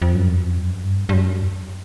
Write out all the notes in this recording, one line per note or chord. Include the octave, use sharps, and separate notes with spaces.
F2
F#2
F2
F#2
G2
G2
F#2